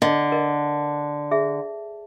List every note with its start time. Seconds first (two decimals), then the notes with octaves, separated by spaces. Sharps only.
0.02 D3 D#5
0.32 A#4 D#5
1.31 G#4 E5